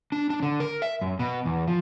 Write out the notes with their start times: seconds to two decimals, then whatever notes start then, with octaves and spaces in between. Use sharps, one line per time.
0.12 D4
0.30 D4
0.43 D3
0.60 A#4
0.82 E5
1.01 F#2
1.19 B2
1.46 E2
1.67 F3